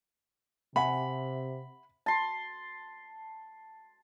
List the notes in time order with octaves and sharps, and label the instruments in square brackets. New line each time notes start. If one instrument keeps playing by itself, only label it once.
[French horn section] C3 [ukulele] E5 F#5 G#5 [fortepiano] B5
[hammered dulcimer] A5 C6